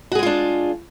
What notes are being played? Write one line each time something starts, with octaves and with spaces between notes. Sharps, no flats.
G#3 D4 F4 F#4 G#4